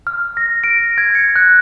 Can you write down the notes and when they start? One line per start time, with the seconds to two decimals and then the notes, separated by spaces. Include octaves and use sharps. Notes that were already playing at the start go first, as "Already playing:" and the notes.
0.07 F6
0.37 A#6
0.64 D7
0.98 G#6
1.15 C#7
1.36 F#6